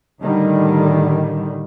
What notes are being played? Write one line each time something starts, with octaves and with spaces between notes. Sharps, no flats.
A2 D3 D#3 G3